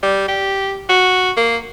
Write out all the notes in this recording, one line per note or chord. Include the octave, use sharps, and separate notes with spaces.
G3
G4
F#4
A#3